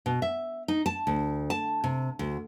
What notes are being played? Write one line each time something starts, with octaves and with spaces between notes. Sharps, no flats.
B2
E5
D#4
A5
D2
A5
C3
D2